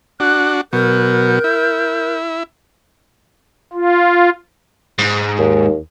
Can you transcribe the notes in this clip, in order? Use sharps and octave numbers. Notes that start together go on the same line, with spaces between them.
D4 F#4 F#6
B2 F#3 A#4 G6
E4
F4
G#2
D#2